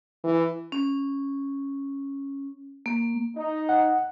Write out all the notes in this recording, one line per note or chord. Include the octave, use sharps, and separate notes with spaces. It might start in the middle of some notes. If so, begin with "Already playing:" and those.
E3
C#4
A#3
D#4
F#5